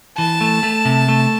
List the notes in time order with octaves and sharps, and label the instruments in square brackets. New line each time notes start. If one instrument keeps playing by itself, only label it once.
[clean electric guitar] E3 [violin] A5
[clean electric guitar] A3
A3
C3
A3